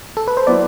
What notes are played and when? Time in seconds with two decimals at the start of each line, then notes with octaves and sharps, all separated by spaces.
0.17 A4
0.28 B4
0.37 C5
0.46 F#3 B3 E4 B4 D5